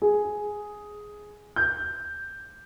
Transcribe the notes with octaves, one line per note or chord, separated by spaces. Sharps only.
G#4
G6